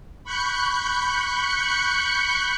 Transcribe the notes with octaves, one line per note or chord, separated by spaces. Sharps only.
B5 C#6 F#6 G6 C#7